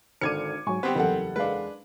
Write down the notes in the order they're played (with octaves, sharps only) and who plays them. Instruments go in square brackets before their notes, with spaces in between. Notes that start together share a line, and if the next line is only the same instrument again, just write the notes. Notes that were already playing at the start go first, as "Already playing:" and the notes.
[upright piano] G#1 D3 D#7 [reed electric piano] D4 F6 [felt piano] D6 G#6 C#7
[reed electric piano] G#2 F#3 [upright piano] G#5 C#6
[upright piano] G3 [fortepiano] B3 C4 G4 [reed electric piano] C5
[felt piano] F#1 A4 F#5 [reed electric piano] E2
[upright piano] G#3 F5 [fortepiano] D4 B4